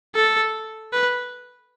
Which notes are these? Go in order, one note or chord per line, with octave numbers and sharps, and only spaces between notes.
A4
B4